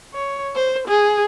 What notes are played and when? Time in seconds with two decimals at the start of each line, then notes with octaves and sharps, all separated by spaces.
0.14 C#5
0.55 C5
0.88 G#4